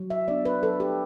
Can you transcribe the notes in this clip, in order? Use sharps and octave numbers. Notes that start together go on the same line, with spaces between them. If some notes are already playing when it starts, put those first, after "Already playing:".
Already playing: F#3
E5
B3 D4 D5
B4
F#3 A4
G4